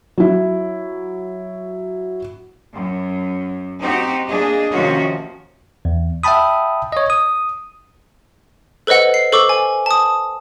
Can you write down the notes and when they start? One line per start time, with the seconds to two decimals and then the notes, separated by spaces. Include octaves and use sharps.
0.18 F#3 E4
2.73 F#2
3.81 C4 D#4 F#4 G4
4.26 A#3 D4 G#4 D#5
4.73 C3 D#3 F3 A#3 C#4 F#4
5.85 E2
6.23 E5 F#5 G5 A5 B5 D#6
6.92 C#5 D#5
7.10 D#6
8.87 A4 B4 C5 D#5 F#5
9.14 C7
9.32 A4 C5 C#6 D6 E6
9.49 G#5
9.86 A5 D#6